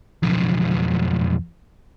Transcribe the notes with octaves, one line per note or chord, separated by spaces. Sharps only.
B1 F2